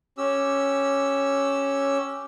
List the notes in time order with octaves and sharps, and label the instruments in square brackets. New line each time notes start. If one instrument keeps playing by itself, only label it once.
[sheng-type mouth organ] C#4 G4 E6